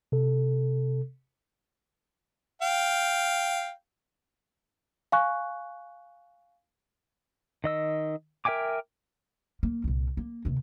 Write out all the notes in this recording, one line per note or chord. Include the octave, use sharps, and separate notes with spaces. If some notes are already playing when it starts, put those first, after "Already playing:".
C3 A4
F5 G5
F5 G#5 C#6 F#6
D#3 D#5 E6
A#4 E5 G5 G#5 D6
A#3
C2 A#2
A#3
D#2 C3